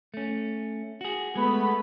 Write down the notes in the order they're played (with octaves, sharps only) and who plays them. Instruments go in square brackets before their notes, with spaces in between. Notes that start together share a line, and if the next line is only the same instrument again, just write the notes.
[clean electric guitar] A3 C#4
F#4 G#4
[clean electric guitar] G#3 [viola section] A3 B3 B5